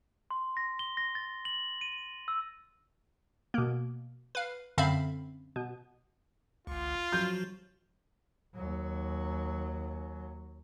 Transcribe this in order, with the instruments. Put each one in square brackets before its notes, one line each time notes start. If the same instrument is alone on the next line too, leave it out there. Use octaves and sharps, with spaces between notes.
[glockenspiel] C6
A#6
G7
A#6
A6
F#7
D#7
E6
[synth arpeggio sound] B2 A#3
B4 F5
F#2 D3 C4 E5 F5 B5
B2
[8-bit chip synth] G1 C#2 [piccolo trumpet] F4
[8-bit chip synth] F3 F#3 F#4 [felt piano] G6
[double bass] D#2 F#3